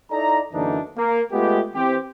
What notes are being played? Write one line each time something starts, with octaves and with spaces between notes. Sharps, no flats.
D#4 E4 A4 D5 A#5
F#2 D3 E3 A#3 D4 D#4
A#3
G#3 A3 B3 F4 G4
E3 C4 G4